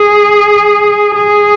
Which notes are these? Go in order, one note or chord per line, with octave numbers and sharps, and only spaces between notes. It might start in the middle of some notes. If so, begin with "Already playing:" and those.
Already playing: G#4
G#4